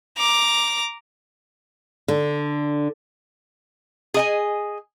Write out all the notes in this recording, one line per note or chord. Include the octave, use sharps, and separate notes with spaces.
A#5 D6
D3
G#4 D#5 G#5